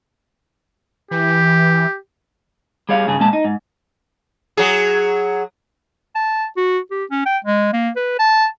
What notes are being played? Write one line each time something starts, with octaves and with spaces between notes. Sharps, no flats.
E3 G4
G3 G#4 C#5 F5
G2 C#3 G#4
A#2 G#3 A5
D#4
G#2
F#3 G#4
A5
F#4
G4
C#4
G5
G#3
A#3
B4
A5